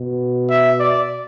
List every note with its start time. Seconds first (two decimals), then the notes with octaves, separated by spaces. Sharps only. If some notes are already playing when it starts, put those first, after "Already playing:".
Already playing: B2
0.50 E5
0.80 D5